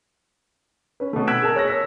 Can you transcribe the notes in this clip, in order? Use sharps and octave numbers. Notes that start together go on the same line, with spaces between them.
C#4 B4
B2 A3
E6 F#6 G#6 B6 D7 E7
G#4 A#4 A5
C#5 F#6 A#6
E6 B6